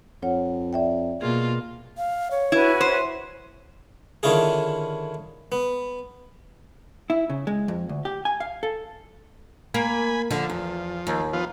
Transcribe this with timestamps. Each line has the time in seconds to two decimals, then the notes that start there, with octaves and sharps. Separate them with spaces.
0.22 F2 F4 C#5 F#5
0.73 D5 E5 G5
1.21 B2 A#3 F4 G#4
1.98 F5
2.31 C#5
2.52 E4 F#4 B4 G#5
2.81 C5
4.23 D3 D#3 C#4 E4 F4 G#4
5.52 B3
7.10 E4
7.30 C#3
7.47 G#3
7.68 F2
7.89 D2
8.05 G4
8.25 G#5
8.40 F5
8.63 A4
9.74 A#3 G#5 B5
10.30 D3 F3
10.50 E2
11.07 D#2
11.33 F3 B3 F4